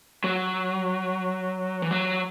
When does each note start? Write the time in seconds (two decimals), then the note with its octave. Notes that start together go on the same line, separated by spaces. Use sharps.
0.24 F#3
1.82 E3
1.91 F#3